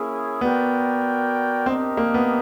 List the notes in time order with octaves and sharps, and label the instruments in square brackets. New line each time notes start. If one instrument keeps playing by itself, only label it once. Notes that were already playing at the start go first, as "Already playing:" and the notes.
Already playing: [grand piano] A#3 [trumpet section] C#4 E4 G#4
[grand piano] B3 [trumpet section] F#4 A#4 D5 G5
[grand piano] C4 [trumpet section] D4 G4 A#4 D#5
[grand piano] A#3
B3